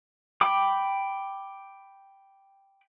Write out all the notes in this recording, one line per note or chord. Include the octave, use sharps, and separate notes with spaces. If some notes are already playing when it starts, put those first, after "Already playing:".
G5 B5 D6